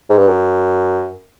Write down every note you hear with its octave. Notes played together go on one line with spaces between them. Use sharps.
G#2
G2
F#2